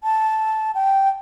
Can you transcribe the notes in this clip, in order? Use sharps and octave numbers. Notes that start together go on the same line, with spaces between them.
A5
G5